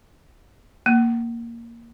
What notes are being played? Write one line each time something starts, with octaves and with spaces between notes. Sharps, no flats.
A#3